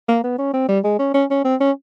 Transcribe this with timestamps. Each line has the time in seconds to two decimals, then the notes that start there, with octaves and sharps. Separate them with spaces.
0.08 A#3
0.24 B3
0.38 C#4
0.54 C4
0.69 G3
0.84 G#3
0.99 C#4
1.14 C#4
1.30 C#4
1.45 C4
1.60 C#4